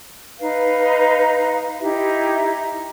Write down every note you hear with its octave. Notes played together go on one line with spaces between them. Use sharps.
D#4 B4 F5
D#4 E4 G4 E5